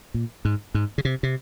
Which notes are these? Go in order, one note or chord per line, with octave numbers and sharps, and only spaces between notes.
A#2
G#2
G#2
C#3
C3
C3